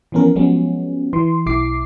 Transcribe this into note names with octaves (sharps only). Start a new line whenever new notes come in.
E3 F3 B3 C#4 A#4
F3 F#3 G#3 B3 C#4
E3 C6
B1 E4 D6 C7